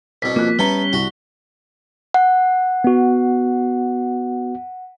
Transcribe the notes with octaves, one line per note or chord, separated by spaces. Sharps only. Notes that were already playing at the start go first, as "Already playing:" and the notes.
C2 B2 B6
F3 A#3 F#6
G3 B3 C#4 B4 E5 A5 A#5 G7
C2 F#4
F#5
B3 F#4